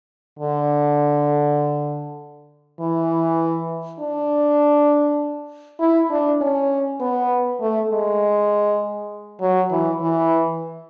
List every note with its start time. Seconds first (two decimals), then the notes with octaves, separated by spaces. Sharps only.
0.39 D3
2.80 E3
4.00 D4
5.80 E4
6.11 D4
6.41 C#4
7.00 B3
7.61 A3
7.91 G#3
9.41 F#3
9.71 E3
10.01 E3